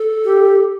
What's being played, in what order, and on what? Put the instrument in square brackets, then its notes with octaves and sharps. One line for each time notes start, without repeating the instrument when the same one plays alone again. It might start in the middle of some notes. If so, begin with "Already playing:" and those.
Already playing: [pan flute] A4
[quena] G4